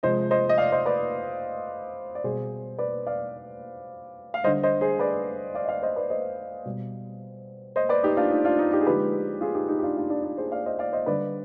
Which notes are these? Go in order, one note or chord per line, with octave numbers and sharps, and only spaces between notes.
C3 F3 G#3 C5 D#5
C5 D#5
D#5
D5 F5
C5 D#5
B4 D5
D5
B2 G3 G#4 C5
B4 D5
D5 F5
F5
D3 G3 C5 D#5
C5 D#5
G#4 C5
B4 D5
D5 F5
D#5
D5 F5
C5 D#5
B4 D5
C5 D#5
B2 G3
C5 D#5
B4 D5
D#4 G4
D4 F4
D#4
D4 F4
D#4
D#4 G4
G#4
D3 F3 G#3 G4 B4
F4 G#4
D#4 G4
D#4 G4
G4
D4 F4
D4 F4
D4 F4
D4
G#4 C5
D5 F5
C5 D#5
D5 F5
C5 D#5
D3 G3 B4 D5